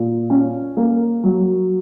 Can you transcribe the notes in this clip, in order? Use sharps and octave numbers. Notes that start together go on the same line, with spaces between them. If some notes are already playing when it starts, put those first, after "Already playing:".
Already playing: A#2
C#4
A#3
F#3